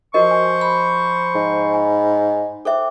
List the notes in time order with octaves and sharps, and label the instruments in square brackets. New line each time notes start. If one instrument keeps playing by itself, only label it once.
[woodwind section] F3 C5 C#6 [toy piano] F#4 A#4 D#5
[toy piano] G#5
[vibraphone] B5
[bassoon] G#2
[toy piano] G#5
[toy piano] A4 C5 E5 [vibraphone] G5 D6